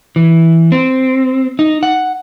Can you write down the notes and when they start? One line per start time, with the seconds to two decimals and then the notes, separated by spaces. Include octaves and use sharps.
0.16 E3
0.72 C4
1.59 D#4
1.83 F#5